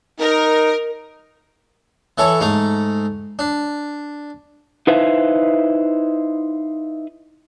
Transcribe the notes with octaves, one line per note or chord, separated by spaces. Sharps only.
D#4 A#4
E3 E4 A4 C#5
G#2 A3 A#5
D4
D#4 E4 B4 C5 E5 F5